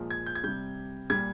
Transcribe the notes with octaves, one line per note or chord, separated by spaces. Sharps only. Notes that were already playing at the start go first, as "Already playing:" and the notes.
Already playing: A#2 F3 G#3
G#6
G6
G#6
C3 G3 G6
A#2 G3 G#6